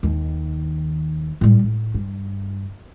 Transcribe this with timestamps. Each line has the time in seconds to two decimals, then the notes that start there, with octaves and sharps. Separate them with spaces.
0.03 D#2 D#3
1.41 A2 G3
1.64 A2
1.94 G2